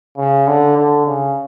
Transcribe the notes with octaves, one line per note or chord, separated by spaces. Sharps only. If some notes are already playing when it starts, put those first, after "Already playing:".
C#3
D3
D3
C#3